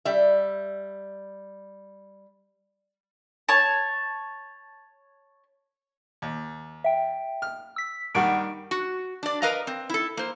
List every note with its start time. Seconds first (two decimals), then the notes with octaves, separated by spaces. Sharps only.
0.05 G3 E5
3.49 C#5 A5
6.22 D#2
6.84 E5 G5
7.42 F6
7.76 E6 B6
8.15 G2 D#3 G3 F#5 C#6 D7
8.71 F#4
9.23 D4 D5
9.42 A#4 B4 D#5 F5 A#5
9.67 C4
9.90 E4 A4
10.17 A#3 C5